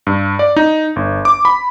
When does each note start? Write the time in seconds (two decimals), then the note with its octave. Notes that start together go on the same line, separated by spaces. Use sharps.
0.07 G2
0.39 D5
0.56 D#4
0.96 G1
1.25 D6
1.45 B5